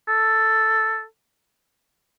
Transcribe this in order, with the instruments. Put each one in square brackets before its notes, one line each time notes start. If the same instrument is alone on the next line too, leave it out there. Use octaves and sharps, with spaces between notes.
[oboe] A4